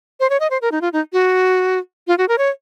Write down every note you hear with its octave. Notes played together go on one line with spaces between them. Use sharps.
C5
C#5
D#5
C5
A#4
D#4
F4
D#4
F#4
F4
F#4
A#4
C#5